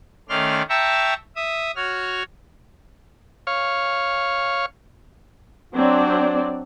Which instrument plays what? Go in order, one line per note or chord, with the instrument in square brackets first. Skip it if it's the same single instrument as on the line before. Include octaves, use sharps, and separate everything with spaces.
[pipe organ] D#3 A3 C#4 D5 C6 F6
E5 G5 A5 A#5 C#6 E6
E5 D#6
F#4 C#5 F6
[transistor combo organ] C#5 F5
[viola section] F#3 C4 D4 D5